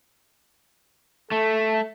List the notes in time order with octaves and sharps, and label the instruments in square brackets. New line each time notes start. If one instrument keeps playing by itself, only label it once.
[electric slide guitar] A3 [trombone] A4